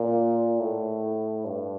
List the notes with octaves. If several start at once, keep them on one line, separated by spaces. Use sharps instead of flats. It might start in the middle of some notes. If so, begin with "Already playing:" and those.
Already playing: A#2
A2
G2